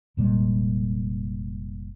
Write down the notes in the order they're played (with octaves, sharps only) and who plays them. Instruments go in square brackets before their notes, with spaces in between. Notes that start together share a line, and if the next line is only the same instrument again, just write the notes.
[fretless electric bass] F1 A#2 G3 G#3